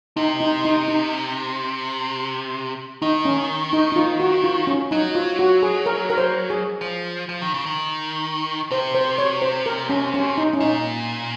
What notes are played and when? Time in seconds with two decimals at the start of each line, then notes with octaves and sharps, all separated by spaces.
0.16 C3 D#4
0.41 D#4
0.65 D#4
0.88 D#4
3.02 D#3 D#4
3.25 C#4
3.73 D#4
3.92 D#4
3.96 F4
4.20 F#4
4.44 F4
4.67 C#4
4.91 F#3 D#4
5.15 F4
5.39 F#4
5.63 G#4
5.86 A#4
6.10 A#4
6.18 C5
6.50 G#4
6.81 F3
7.29 F3
7.42 D#3
7.54 C#3
7.66 D#3
8.71 C3 C5
8.94 C5
9.18 C#5
9.42 C5
9.66 A#4
9.89 C#4
10.14 C#4
10.38 D#4
10.53 C#4
10.60 A#2 D#4